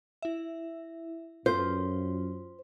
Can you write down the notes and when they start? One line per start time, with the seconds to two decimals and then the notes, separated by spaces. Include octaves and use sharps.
0.22 E4 E5
1.46 F#2 F4 C5